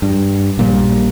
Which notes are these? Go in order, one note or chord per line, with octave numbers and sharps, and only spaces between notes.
G2
A#1 A#2 G3